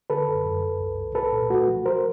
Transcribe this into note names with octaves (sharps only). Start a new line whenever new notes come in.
D3 A4 B4
F#2
F#2
F#2
C2
C2
C2 A4 B4
A#2
A3 F#4
F3
F3 A#4 C5